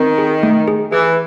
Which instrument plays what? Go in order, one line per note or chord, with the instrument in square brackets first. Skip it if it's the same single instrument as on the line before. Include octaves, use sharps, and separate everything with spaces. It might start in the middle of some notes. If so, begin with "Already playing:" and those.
Already playing: [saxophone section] D#3 [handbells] C4
[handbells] G#4
A3
G#4
[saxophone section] E3 [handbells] G#4